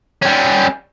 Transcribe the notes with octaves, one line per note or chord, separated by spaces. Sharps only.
G3 C#4